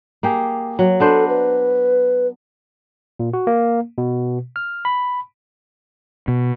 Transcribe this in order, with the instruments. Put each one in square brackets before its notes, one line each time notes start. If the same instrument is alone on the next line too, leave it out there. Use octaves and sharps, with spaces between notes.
[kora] A#3 G4 G#4
F#3
[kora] B3 D4 C5 [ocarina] A4
[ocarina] B4
[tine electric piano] A#2
F#4
A#3
B2
F6
B5
[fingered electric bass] B2